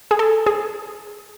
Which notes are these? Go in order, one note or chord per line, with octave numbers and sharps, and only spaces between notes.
G#4
A4
G#4